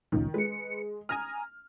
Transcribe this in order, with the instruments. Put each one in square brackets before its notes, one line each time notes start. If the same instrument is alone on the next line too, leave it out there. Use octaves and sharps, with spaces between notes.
[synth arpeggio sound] C#2 F#2 A#2 [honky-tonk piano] D#3
[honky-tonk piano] G#3 [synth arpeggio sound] B4 C#7
[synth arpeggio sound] G#5 A#5 D#6 [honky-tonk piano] F6